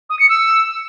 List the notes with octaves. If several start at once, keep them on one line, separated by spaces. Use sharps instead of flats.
D#6
C#7
E6